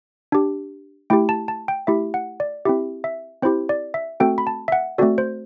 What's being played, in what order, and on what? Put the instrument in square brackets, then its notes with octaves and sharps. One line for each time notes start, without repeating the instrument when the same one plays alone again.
[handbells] D4 G4
A3 E4 G4 G5
A5
A5
G5
A3 E4 G4 E5
F#5
D5
C4 E4 G4 E5
E5
C4 E4 G4 C5
D5
E5
A3 C4 F#4 A4 G5
B5
A5
E5
F#5
A3 C4 F#4 A4 D5
C5